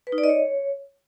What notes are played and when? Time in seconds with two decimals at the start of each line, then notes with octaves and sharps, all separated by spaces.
0.07 B4
0.12 D#4
0.18 D5
0.24 D#5
0.29 C#5